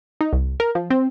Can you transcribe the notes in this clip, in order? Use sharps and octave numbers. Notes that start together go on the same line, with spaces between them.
D#4
C2
A#4
F3
C4